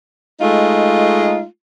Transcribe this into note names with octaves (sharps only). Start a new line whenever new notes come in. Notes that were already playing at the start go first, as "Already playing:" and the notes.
G#3 A3 D#4 F4